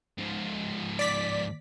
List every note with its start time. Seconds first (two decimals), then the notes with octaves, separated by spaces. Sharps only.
0.18 G#2 F3
0.99 D5 B6